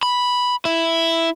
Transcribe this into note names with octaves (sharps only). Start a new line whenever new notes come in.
B5
E4